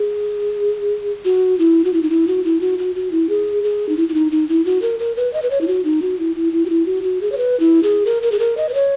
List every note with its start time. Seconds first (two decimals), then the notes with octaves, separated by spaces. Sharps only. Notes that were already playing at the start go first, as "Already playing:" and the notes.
Already playing: G#4
1.25 F#4
1.59 E4
1.85 F#4
1.94 E4
2.02 D#4
2.10 E4
2.28 F#4
2.44 E4
2.61 F#4
2.79 F#4
2.95 F#4
3.12 E4
3.29 G#4
3.64 G#4
3.89 D#4
3.97 E4
4.09 E4
4.14 D#4
4.32 D#4
4.49 E4
4.66 F#4
4.82 A#4
4.99 A#4
5.16 B4
5.33 D#5
5.42 B4
5.50 C#5
5.61 E4
5.68 F#4
5.85 D#4
6.02 F#4
6.19 E4
6.36 E4
6.53 E4
6.65 F#4
6.70 E4
6.86 F#4
7.03 F#4
7.21 G#4
7.32 C#5
7.37 B4
7.60 E4
7.83 G#4
8.06 A#4
8.23 A#4
8.32 G#4
8.39 A#4
8.57 D#5
8.69 B4
8.74 C#5